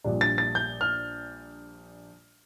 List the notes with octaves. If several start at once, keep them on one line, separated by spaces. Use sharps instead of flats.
A#1 A#2 G3 D4
A6
A6
G6
F6